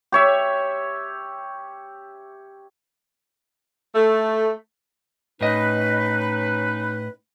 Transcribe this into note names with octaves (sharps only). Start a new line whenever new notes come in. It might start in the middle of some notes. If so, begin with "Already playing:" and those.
G4 C#5 E5
A3
A2 C#4 D#4 B4 D#5